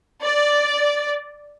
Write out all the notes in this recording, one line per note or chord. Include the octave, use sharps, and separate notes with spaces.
D5